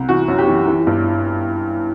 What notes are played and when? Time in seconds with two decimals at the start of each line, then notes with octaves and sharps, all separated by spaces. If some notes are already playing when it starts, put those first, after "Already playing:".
Already playing: C2
0.09 E3 F#4
0.28 F#2
0.38 G4
0.47 E3
0.68 E3
0.87 G2